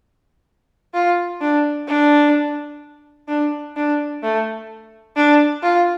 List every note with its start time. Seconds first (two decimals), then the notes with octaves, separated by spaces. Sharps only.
0.94 F4
1.41 D4
1.88 D4
3.28 D4
3.76 D4
4.23 A3
5.17 D4
5.63 F4